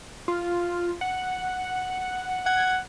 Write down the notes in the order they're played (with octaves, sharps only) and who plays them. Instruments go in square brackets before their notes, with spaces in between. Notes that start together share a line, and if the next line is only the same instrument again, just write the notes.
[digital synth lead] F4
F#5
[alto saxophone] F#5 [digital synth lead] G#6